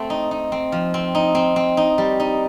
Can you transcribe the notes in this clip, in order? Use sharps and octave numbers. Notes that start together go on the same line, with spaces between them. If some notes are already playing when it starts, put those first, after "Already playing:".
Already playing: A3 C4
D#4
D#4
C4
F3
C4
D#4
C4
C4
D#4
G3
D#4